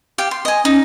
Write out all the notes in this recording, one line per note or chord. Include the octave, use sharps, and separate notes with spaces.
G4 F5 G5
C6
D#5 G#5
C#4 D#4